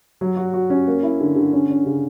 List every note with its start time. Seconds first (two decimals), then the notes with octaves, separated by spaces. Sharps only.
0.21 F#3
0.37 F#4
0.54 F#4
0.70 C#4
0.87 A#3
1.03 E4
1.21 D3
1.36 D3
1.53 C#4
1.70 C#4
1.86 C#3